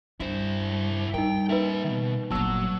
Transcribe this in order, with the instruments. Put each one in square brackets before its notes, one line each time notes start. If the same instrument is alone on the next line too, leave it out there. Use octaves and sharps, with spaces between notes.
[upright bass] G2 [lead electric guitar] E4 C5
[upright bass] G3 [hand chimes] D#4 A#4 [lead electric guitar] G5
[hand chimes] A#3 D#4 B4 [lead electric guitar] A#4 E5
[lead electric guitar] B2 D#3
[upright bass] G1 A#2 [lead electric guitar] F#3 [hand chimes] B3 A5 E6